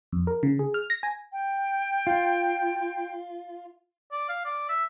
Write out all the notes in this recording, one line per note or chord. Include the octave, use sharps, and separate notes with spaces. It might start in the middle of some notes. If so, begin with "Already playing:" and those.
F2
A#4
C#3
G#4
F6
A#6
G#5
G5
F4
D5
F5
D5
E5